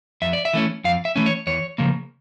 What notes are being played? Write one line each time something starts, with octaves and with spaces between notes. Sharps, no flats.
F2 E5
D5
E5
E3 A3 C#4
F2 F5
E5
E3 A3 C#4
C#5
E2 C#5
C#3 F3 A#3